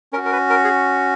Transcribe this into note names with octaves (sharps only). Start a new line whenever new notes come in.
C#4 F#4 A#4
A#4
B4
A#4
G#4